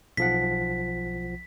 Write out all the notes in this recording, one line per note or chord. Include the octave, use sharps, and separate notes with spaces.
B1 F3 F#5 B6